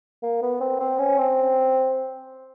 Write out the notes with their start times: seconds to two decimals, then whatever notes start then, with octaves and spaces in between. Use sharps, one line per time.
0.23 A#3
0.42 B3
0.60 C4
0.80 C4
0.99 C#4
1.18 C4